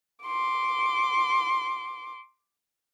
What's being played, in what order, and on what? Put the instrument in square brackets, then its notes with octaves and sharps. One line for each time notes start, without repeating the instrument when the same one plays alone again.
[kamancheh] C6 D6